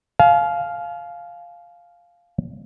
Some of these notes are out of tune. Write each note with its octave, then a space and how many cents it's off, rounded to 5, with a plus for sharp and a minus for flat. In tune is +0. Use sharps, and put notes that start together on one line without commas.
F5 +0 G#5 +45